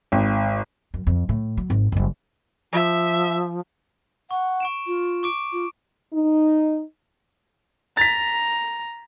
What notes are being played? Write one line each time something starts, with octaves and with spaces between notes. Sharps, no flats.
G#1
F#2
F2
A2
F#3
G#1
F#1 G3
F3 E5
F#5 C#6
C#6 D7 E7
F4
C#6 D6 D7
F4
D#4
A#5 A6 B6